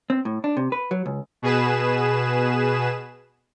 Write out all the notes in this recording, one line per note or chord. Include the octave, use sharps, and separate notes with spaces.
C4
A2
D4
C3
B4
F#3
C#2
B2 G#4 B4 E7